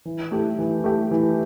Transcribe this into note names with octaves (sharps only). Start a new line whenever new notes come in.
E3
A3 E4 G4
E3
A3 E4 G4
E3